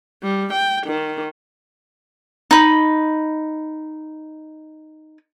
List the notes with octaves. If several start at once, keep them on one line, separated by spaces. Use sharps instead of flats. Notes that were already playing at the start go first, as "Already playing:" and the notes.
G3
G5
D#3
D#4 B5